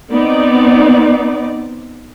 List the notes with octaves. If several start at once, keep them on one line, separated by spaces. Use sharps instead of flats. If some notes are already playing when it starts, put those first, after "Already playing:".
B3 C4 D#4 D5